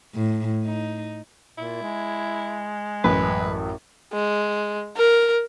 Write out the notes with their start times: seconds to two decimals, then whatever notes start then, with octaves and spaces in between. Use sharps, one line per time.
0.15 A2
0.64 D#4
1.58 A#2 E4
1.82 G#3
3.04 A1 F#2 B4
4.13 G#3
4.97 A#4